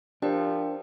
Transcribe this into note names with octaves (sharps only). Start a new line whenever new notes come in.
F3 D4 G4 A#4 G5